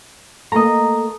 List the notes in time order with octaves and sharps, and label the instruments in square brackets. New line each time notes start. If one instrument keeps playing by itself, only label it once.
[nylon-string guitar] A3 A#3 A4 [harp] D#5 A#5